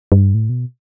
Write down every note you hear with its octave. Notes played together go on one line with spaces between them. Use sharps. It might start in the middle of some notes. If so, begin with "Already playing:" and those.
G2
A2
B2